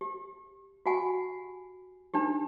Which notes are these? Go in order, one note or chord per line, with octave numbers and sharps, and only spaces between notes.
G4
F#4 G4 F#5 G#5
D4 D#4 G4